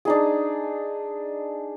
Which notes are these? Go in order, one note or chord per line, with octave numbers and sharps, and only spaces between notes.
D4 D#4 G#4